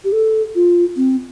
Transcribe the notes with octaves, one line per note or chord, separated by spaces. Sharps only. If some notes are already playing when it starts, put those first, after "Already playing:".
G4
A4
F4
C4